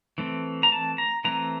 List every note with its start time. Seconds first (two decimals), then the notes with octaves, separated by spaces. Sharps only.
0.18 E3 A3 C4
0.63 A#5
0.72 A5
0.98 A#5
1.25 E3 A3 C4 A#5